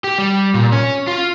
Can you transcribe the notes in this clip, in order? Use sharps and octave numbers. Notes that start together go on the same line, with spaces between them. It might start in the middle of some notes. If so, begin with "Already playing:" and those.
G4
G3
A#2
C#4
F4